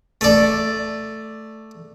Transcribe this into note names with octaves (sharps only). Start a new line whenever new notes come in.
A3 D5